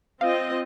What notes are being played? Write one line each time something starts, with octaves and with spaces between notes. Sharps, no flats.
C4 F4 D#5 F5